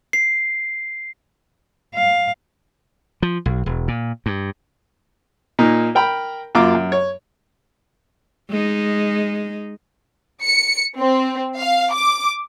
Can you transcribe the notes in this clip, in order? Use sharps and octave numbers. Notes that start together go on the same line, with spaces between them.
C7
F5
F3
B1
E1
A#2
G2
A#2 A#3 D#4
A#4 G5 A#5 B5
F#2 A#3 F4 D6
F#2
C#5
G#3 D#4
C#7
C4
F5
D6